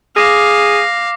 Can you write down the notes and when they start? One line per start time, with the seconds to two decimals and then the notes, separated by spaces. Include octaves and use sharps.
0.17 G#4 F5 D6 A#6